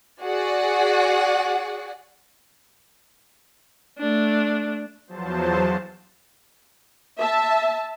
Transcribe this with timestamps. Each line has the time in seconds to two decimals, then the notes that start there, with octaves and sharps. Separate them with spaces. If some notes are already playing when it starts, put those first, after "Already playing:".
0.21 F#4 G#4 D5 F#5
3.98 A3 D4
5.07 E2 F3 F#3 C5 A5
7.18 E5 A5